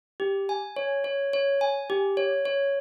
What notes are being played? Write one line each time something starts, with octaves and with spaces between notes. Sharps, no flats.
G4
G#5
C#5
C#5
C#5
G#5
G4
C#5
C#5